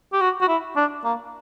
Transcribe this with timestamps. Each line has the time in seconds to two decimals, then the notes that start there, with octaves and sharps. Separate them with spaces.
0.13 G4
0.21 F#4
0.41 F#4
0.48 E4
0.76 D4
1.04 A#3